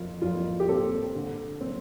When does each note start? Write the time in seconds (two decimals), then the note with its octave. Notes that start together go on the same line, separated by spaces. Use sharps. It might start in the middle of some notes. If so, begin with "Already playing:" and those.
Already playing: F2 F4
0.22 F2 F4
0.60 G4
0.69 C4 A4
1.15 D3
1.61 C4